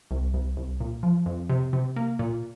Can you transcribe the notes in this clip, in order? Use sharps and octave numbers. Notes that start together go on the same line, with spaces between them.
C2
C2
C2
A#2
F3
F2
C3
C3
A#3
A#2